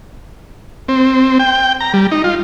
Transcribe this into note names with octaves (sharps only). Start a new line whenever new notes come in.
C4
G5
A#5
G3
D#4
F4